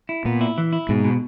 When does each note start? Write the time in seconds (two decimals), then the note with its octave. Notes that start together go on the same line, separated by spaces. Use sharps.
0.09 E4
0.25 A#2 B3
0.41 E4
0.58 E3
0.73 E4
0.89 G#2 B2
1.05 B2